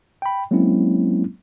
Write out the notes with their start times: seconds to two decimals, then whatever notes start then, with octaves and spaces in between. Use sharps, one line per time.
0.22 G5 B5
0.51 F#3 G#3 A#3 C4 C#4 E4